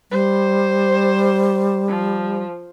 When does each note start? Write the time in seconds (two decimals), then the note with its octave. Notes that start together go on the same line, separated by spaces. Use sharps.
0.11 G3 C5
1.88 F3